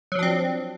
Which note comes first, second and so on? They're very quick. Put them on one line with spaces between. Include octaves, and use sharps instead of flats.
F#3 F3 D4 C4